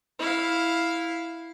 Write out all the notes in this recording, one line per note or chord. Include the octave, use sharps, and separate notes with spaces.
E4 F5